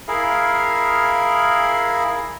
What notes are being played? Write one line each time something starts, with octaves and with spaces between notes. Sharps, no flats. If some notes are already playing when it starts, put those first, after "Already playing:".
E4 G#4 A#4 F5